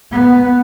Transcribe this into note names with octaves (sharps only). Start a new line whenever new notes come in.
B3